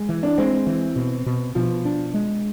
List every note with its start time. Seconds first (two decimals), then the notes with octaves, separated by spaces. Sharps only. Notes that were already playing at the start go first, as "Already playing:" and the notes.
Already playing: G#3
0.09 E3
0.23 D4
0.38 G#3 C4
0.67 E3
0.96 B2
1.26 B2
1.55 B2 F3
1.85 D4
2.14 G#3